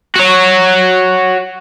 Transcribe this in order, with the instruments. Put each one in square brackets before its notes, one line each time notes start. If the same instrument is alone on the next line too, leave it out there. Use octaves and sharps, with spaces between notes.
[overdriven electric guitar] F#4 C#5